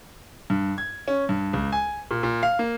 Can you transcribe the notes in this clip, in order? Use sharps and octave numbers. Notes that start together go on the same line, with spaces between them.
G2
G#6
C#4
G2
C#2
G#5
A#2
A#2
F5
A#3